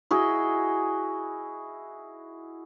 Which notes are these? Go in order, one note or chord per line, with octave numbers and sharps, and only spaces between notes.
E4 F#4 G#4 D#5